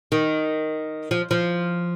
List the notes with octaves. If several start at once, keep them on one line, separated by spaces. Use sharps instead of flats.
D#3
F3
F3